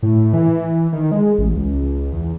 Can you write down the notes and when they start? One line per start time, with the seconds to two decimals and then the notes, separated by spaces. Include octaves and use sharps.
0.03 A2
0.33 E3
0.93 D#3
1.11 G#3
1.38 A1
1.56 C#2
2.12 E2